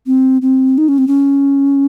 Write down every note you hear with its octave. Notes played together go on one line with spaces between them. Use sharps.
C4
C4
D#4
C#4
C4
C#4